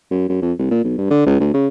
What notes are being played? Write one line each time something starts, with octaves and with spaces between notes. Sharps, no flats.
F#2
F#2
F2
C2
A#2
B1
G2
D3
C#2
D2
C#3